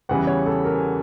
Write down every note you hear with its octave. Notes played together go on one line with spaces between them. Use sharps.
E2 C#3 E3 G3 F#5
C#5
A4
A#4